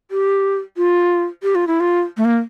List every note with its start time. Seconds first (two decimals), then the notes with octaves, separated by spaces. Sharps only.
0.11 G4
0.77 F4
1.43 G4
1.55 F4
1.67 E4
1.80 F4
2.17 A3
2.25 A#3